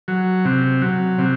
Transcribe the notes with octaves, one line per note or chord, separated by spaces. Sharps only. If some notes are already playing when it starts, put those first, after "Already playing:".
F#3
C3
F#3
C3